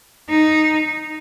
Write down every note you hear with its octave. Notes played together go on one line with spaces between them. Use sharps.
D#4